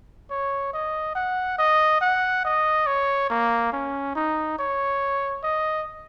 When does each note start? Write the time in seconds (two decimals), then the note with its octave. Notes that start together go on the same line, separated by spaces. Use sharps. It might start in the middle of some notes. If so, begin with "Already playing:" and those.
0.30 C#5
0.73 D#5
1.15 F#5
1.58 D#5
2.01 F#5
2.45 D#5
2.87 C#5
3.30 A#3
3.72 C#4
4.15 D#4
4.58 C#5
5.43 D#5